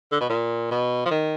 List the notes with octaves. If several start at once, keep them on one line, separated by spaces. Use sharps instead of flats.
D3
B2
A#2
B2
F3
D#3